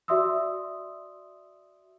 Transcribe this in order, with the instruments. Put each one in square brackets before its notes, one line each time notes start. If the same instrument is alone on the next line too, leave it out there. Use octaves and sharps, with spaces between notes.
[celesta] F#4 D5 E5 C6 D#6 E6